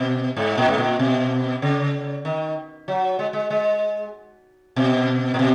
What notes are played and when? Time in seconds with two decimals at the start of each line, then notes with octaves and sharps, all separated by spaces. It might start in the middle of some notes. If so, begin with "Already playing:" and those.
Already playing: B2
0.37 G#2
0.57 A#2
0.68 G#2
0.78 A#2
0.99 B2
1.62 C#3
2.25 D#3
2.88 F#3
3.19 G#3
3.33 G#3
3.50 G#3
4.76 B2
5.34 A#2
5.39 B2